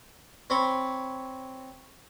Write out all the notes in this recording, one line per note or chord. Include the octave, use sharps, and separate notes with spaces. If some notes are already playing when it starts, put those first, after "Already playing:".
C4 C#5 B5